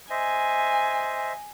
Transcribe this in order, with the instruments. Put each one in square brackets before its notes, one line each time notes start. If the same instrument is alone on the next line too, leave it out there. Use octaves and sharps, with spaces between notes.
[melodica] C5 D#5 E5 [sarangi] G#5